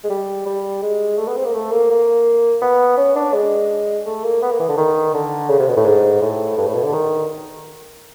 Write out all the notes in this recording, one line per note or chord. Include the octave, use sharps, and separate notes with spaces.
G#3
G3
G3
G#3
A3
B3
C4
A#3
A3
A#3
A#3
B3
C#4
D4
G#3
A3
A#3
B3
A#3
E3
D3
D#3
D3
C#3
C3
B2
A2
G#2
A2
G2
A2
B2
D3
D#3